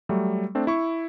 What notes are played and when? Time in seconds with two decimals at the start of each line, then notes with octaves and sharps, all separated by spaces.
0.09 F#3 G3 A3
0.55 A3 C4 D4
0.67 E4 C#6